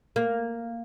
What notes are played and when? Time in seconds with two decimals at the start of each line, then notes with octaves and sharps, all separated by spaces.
0.16 A#3